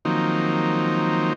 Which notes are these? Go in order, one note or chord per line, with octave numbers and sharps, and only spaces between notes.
D#3 F3 F#3 A#3 C4 D#4